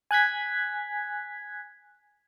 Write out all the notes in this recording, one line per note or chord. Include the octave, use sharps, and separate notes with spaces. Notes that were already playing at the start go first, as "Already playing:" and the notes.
G#5 F#6 G#6 B6